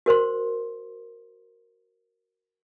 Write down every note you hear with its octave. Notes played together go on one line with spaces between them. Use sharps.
F#4 A#4 C5 C6